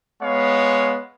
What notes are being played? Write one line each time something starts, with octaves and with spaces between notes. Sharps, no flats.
G#3 B3 C#5 F5